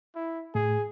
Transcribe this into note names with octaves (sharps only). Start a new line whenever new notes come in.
E4
A2 G#4